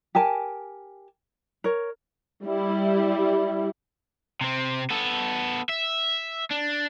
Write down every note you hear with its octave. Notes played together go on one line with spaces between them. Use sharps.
G4 A#4 G#5 A5
A#4 C#5
G3 E4
C3 C4
B3 A4
E5
D4